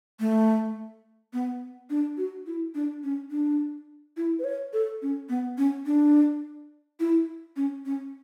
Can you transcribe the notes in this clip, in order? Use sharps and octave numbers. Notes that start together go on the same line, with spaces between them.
A3
B3
D4
F#4
E4
D4
C#4
D4
E4
B4
C#5
A4
C#4
B3
C#4
D4
E4
C#4
C#4